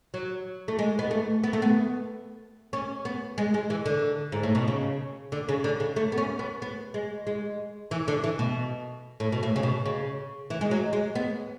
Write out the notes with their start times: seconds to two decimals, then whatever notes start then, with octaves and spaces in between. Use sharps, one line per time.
0.14 F#3
0.68 A3
0.79 G#3
0.99 B3
1.11 A3
1.44 B3
1.53 A3
1.62 B3
2.73 C#4
3.05 B3
3.38 G#3
3.54 G#3
3.70 E3
3.86 D3
4.32 G#2
4.43 A2
4.55 B2
4.68 C#3
5.32 D3
5.49 C#3
5.64 D3
5.80 C#3
5.96 A3
6.12 B3
6.18 C#4
6.39 B3
6.62 B3
6.94 G#3
7.27 G#3
7.91 E3
8.08 D3
8.24 E3
8.39 B2
9.20 A2
9.32 B2
9.43 A2
9.56 C#3
9.63 B2
9.86 C#3
10.50 E3
10.61 G#3
10.71 F#3
10.93 G#3
11.15 B3